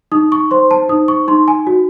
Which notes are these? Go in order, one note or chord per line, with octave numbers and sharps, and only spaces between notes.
D#4 D#6
C#6
C5 C6
A5
D#4 D#6
C#6
D#4 C6
G#5
F#4